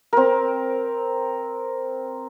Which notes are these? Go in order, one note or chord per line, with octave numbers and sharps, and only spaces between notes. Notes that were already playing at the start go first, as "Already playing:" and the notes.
C4 A#4